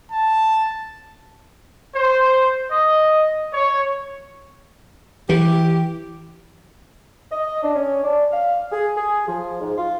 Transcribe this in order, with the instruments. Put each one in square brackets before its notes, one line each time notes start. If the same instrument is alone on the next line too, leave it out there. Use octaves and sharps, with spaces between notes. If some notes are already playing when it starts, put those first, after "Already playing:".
[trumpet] A5
[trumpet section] C5
D#5
C#5
[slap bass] E3 [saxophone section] G4
[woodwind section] D#5
D4
C#4
D4
F5
G#4
G#4
F3
G#2
F4